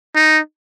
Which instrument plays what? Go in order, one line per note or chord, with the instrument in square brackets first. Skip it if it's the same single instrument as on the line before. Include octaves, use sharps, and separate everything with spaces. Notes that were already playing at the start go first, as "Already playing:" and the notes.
[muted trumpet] D#4